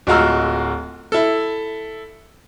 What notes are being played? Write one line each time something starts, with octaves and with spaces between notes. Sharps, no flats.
D1 G#3 F4 F#4 A#5 E6
E4 A4